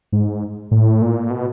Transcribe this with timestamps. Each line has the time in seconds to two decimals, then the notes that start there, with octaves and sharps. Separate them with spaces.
0.12 G#2
0.71 A2
1.02 A#2
1.30 B2